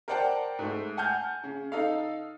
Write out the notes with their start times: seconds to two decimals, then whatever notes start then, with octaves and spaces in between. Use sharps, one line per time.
0.08 A#4 C5 D5 F#5 G5 A5
0.59 G#2 A3
0.97 F#5 G#5 A5 F6 G6
1.44 C#3
1.72 D#4 A4 F5